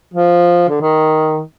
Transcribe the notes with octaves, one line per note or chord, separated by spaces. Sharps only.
F3
D3
D#3